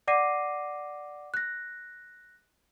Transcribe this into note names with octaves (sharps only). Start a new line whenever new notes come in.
D5 F#5 D6 A#6 C7 D#7
F#6 A#6